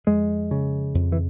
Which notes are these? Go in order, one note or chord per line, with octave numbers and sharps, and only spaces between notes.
F2 G#3
C#3
F2
E3